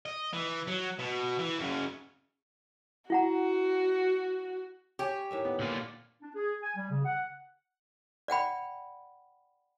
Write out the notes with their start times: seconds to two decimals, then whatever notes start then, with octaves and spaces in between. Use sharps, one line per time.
0.06 D#5
0.33 E3
0.68 F#3
0.99 B2
1.39 E3
1.59 F#2 C#3
3.10 E4 F#4 F#5 A#5
4.99 G4 C#5 G#5
5.31 A2 D#3 E5
5.45 B3
5.59 A#2 D3 F4
6.22 D4
6.35 G#4
6.63 G#5
6.77 G3
6.91 C#3
7.05 F#5
8.28 D5 F#5 G5 B5